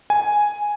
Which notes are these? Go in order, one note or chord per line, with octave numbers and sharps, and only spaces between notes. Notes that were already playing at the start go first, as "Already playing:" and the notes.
G#5